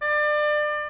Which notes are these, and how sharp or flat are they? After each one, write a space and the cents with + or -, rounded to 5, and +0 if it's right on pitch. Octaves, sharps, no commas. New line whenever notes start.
D5 +30